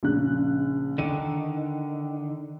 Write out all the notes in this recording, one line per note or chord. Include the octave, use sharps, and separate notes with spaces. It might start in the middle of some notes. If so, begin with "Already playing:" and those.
A#1 C#3 F#6
D3 D#3 D#7